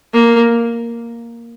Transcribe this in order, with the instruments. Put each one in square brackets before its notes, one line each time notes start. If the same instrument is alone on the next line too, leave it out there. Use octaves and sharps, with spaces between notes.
[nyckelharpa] A#3